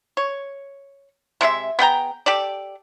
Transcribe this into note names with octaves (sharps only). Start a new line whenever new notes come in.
C#5
C3 G#3 E4 E5
B3 G#4 G5 A#5
G4 A4 D5